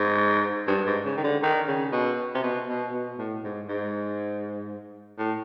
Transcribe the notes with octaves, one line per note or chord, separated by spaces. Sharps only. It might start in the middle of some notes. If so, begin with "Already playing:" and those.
Already playing: G#2
G2
G#2
C#3
D#3
D3
D#3
C#3
B2
C3
B2
B2
B2
A2
G#2
G#2
A2